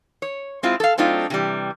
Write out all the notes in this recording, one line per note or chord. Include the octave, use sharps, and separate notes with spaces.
C#5
G#3 C4 E4 F4
A4 F5
F#3 A3 C4 D4 D#4 F4
C3 E3 G3